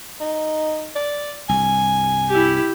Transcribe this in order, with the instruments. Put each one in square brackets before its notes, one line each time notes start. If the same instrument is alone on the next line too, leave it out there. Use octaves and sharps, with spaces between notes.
[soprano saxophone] D#4
D5
[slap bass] C2 G2 [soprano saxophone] G#5
[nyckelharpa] E4 G4